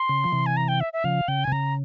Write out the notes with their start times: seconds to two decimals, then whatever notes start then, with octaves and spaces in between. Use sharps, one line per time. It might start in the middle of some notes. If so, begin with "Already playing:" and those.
Already playing: C6
0.09 C#3
0.24 F3
0.32 C3 E3
0.46 G#5
0.57 A#5
0.68 G5
0.80 E5
0.93 E5
1.04 C#3 F3 F5
1.28 C#3 G5
1.44 G#5
1.48 C3
1.52 C#3 A#5